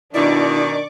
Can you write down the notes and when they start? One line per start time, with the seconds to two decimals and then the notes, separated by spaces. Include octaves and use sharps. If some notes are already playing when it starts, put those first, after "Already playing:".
0.14 B2 D#3 D4 E4 D5 C#6 D6